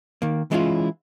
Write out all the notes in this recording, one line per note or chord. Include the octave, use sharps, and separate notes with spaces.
D#3 A#3
E3 G#3 C#4 D4 E4 F4